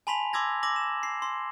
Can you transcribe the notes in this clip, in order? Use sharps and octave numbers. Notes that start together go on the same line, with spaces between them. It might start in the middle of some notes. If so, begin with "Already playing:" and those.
G#5 A5 B5 C6 B6 F7
C6 D6 E6 G#6 A#6
D6 E6 A#6 F#7
E7
C7
C6